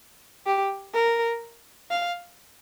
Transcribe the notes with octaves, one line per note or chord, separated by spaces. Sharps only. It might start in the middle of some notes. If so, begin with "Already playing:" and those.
G4
A#4
F5